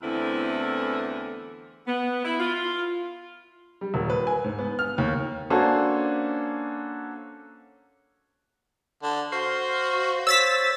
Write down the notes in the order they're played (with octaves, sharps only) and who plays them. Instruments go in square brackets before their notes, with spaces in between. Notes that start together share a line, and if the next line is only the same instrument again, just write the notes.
[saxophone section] E2 D3 E3 A3 C4 E4
B3
E4
F4
[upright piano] G3
D#1
B4
G#5
G#2
B3
F6
D#2
A#3 C#4 D4 F#4 A4 C5
[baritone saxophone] D3
[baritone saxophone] F#4 [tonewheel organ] C5 F5 C6
[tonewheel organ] C5 C#5 [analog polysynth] E6 A6 B6